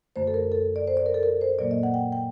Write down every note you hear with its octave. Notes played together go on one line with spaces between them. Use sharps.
F#2 D3 A3 C5
A4
A#4
A4
D5
C5
D5
A#4
A4
A#4
C5
A#2 F#3 A#3 D5
D#5
F#5
G5
G5